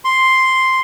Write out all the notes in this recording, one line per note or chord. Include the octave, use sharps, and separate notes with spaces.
C6